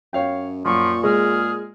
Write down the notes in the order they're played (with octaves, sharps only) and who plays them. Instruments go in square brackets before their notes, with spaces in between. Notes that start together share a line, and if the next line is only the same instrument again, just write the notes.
[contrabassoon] F#2 [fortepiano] C#5 F5 G5
[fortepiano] F#2 [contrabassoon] A#2 [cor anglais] F3 [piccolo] C#6
[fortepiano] G#3 [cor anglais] G#4 [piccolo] F6